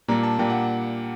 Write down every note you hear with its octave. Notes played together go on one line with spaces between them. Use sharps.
A#2 G3 A#3 D4 A#5
A5
A#2 G3 A#3 D4 G5
F#5